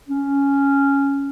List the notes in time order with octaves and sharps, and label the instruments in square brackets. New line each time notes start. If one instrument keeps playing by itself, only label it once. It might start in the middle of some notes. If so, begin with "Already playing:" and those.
[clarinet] C#4